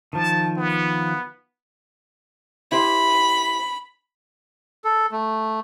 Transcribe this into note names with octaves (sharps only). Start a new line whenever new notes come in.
D#3 F3 A5
B3
E4 G4 C5 B5
A4
A3